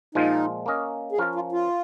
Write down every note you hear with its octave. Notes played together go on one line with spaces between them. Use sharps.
A#2 F3 G#3 D#4 F4
A#3 C#4 A#4 D#5
G#4
F3 C#4 F4 A#4 F5
F4
F4